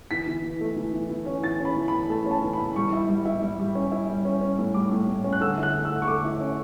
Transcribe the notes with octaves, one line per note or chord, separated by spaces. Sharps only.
E3 B6
E3
E3
A3
E3
E3
E3
C#4
E3 A6
C#4
B5
E3
E3 B5
A3 A5
C#4
A5
E3
B5
E3
G3 C#6
E4
G3
E4
G3
G3
C#4
E4
G3
C#4
C#4
A2
G3 D6
A2
A2
C#4
F#6
D3 E6
E4
F#6
A3
E6
D3
C#6
A3 D6
E4
C#4